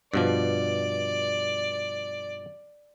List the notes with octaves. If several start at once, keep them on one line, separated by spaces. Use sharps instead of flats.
G2 B2 F3 D5